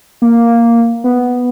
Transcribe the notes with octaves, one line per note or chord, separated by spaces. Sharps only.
A#3
B3